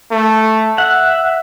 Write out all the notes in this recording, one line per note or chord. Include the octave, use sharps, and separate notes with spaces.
A3
E5 F#5